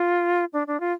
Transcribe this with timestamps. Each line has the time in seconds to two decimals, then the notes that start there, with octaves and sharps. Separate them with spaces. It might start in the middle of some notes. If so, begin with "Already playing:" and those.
Already playing: F4
0.53 D4
0.67 D4
0.80 F4